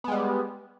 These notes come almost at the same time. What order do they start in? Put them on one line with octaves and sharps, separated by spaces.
B3 G#3 G3